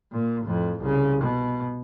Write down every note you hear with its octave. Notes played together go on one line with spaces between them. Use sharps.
A#2
F2 A2
C2 C#3
B2